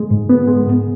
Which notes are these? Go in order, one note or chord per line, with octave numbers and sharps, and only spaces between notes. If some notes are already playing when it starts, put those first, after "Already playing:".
Already playing: G#3
G#2
B3
G#3
G#2